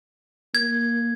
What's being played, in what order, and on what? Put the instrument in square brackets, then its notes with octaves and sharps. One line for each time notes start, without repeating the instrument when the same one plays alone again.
[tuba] A#3 [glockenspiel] G#6